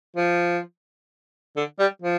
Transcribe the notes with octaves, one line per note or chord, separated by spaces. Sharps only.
F3
D3
G3
F3